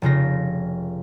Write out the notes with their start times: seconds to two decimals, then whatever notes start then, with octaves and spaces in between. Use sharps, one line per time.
0.02 F1 C#3 F4 A#6